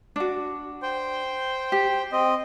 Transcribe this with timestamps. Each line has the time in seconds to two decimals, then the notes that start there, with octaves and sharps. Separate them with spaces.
0.16 D4 F#4
0.82 C5 G5
1.72 G4
2.12 C4 D#5